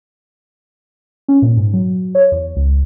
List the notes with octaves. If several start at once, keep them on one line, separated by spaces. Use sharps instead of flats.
C#4
A#2
G#2
F#3
C#5
E2
C#2